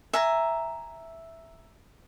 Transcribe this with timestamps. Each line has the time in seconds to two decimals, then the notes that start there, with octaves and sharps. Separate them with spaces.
0.13 E5 G#5 A#5